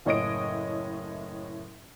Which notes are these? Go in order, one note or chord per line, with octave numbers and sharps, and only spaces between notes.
F#1 A2 C#5 D#5 D#6 D7